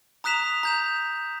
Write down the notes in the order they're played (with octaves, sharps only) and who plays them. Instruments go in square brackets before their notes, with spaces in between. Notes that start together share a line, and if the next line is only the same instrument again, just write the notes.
[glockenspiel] A#5 D#6 F#6 B6 E7 F7
A#5 G6 E7